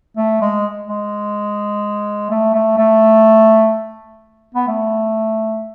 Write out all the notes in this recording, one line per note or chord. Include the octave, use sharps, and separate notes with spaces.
A3
G#3
G#3
A3
A3
A3
B3
A3